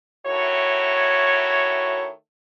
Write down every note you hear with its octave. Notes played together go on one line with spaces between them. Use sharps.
D#3 A3 E4 F#4 C#5